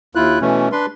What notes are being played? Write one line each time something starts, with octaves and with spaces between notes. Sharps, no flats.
D#2 E4 F4 F#6
B2 E3 A3 C#4
D4 B4 C6